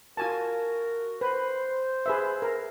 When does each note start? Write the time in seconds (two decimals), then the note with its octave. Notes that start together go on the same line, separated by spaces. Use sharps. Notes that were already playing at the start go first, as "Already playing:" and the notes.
0.17 F4 F#4 A#4 G#5 A5
1.21 B4 C5
2.06 G#4 B4 E5
2.42 A#4